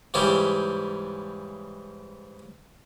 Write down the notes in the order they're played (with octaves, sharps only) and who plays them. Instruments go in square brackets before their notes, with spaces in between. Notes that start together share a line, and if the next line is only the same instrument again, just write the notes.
[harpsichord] G#2 C#3 E3 G3 G4 C#6